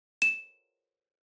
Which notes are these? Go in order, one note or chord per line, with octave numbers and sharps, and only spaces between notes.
E7